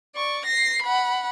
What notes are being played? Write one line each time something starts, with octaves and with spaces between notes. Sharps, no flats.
D5 C#6
A#6 C7
F#5 B5